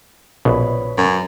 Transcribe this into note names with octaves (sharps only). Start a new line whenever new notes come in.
A#1 B2 B4 C#5 B5
F#2